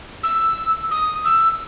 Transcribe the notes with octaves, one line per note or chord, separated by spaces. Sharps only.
E6
D#6
E6